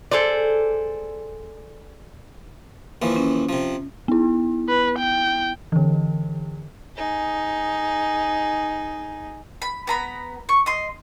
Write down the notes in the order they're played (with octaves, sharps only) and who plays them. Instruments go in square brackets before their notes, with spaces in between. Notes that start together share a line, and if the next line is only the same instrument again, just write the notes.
[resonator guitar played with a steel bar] G#4 A4 C5 D5
[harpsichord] D#2 E3 F3
[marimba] C#4
[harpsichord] C3 F3
[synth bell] B3 E4
[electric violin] B4
G5
[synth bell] D3 E3
[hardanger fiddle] D#4 G#4
[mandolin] B5
B3 A#5 B5
C#6
D#5 C6